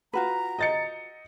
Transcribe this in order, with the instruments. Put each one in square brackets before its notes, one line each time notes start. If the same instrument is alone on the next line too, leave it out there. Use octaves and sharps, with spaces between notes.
[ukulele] F4 F#4 B4 [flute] A#5
[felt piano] D#5 A6 C#7